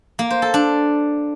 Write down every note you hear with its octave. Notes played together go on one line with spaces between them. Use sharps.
A#3
C5
A4
D4